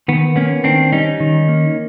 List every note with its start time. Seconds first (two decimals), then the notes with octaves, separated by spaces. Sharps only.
0.08 D#3 B3
0.36 A#3 B3 C#4
0.64 D#3 C4 D4
0.92 G3 C#4 D#4
1.20 D#3
1.48 A#3